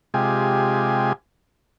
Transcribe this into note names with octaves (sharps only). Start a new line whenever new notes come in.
C3 G#3 F4 G4 G#5